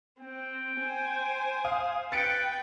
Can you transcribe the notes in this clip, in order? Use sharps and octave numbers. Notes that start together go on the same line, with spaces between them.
C4 G5
C5 G#5
F5 D#6
B4 G5 A6 C#7 D7